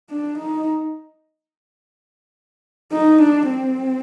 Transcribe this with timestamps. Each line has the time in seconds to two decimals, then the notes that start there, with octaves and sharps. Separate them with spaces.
0.10 D4
0.39 D#4
2.92 D#4
3.22 D4
3.49 C4